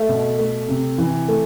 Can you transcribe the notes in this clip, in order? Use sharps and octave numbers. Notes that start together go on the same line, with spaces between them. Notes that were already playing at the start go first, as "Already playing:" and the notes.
Already playing: A3 E5
B2
A3
C3
E3
A3